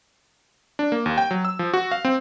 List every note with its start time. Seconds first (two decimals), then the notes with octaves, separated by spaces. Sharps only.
0.79 D4
0.92 A#3
1.06 D#2
1.18 G5
1.31 F#3
1.45 E6
1.59 F3
1.74 F#4
1.92 F5
2.05 C4